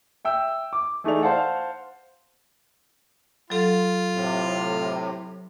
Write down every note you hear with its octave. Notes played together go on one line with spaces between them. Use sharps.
E5 G5 E6
D6
E3 A3 D#4 G#4 D5 F7
C5 F5 F#5 A5
F#3 F4 A4
A2 C3